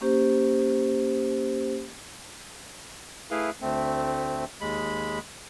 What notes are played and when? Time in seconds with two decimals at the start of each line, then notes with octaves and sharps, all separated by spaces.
0.01 A#3 C#4 G4 C5
3.31 A3 E4 G#4 B4 F5
3.61 D2 A3 C4
4.61 D#2 G#3 B5